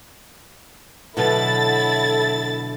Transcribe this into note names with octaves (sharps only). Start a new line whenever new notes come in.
B2 D3 F#3 E4 A4 A6